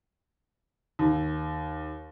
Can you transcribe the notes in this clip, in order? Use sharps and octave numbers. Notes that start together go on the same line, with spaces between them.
D#2